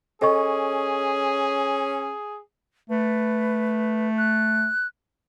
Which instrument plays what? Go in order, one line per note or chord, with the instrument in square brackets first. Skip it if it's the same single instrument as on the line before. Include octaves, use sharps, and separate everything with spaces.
[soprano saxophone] C#4 [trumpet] G#4 [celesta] A4 D#5 C#6
[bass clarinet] A3 [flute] B4
[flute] F#6